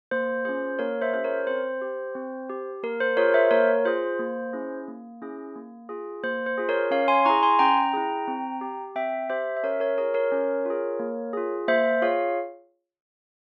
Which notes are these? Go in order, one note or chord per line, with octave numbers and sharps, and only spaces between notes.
A#3 C5
C#4 F4 G#4 C5
A#3 A#4 C#5
C5 E5
C#4 F4 G#4 C5
A#4 C#5
C4 C5
G4
C4
G4
A#3 A#4
C5
F4 G#4 A#4 C#5
C5 E5
A#3 A#4 C#5
F4 G#4 C5
A#3
C#4 E4 G#4
A#3
C#4 E4 G#4
A#3
F4 G#4
A#3 C5
C5
F4 G#4
A#4 C#5
C#4 C#5 F5
G#5 C6
E4 G#4 A#5 C#6
G#5 C6
C#4 G5 A#5
E4 G#4
C4
G4
C4 E5 G5
G4 C5 E5
E5
C#4 A#4 C#5
A#4 C#5
F4 G#4 A#4 C#5
A#4 C#5
C#4
F4 G#4
A#3
F4 G#4
A#3 C5 E5
F4 G#4 C#5 F5